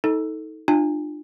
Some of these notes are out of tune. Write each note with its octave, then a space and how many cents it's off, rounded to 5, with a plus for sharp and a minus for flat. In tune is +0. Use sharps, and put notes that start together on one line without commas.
D#4 +30 A4 +0
D4 +40 F4 +0 G#5 -30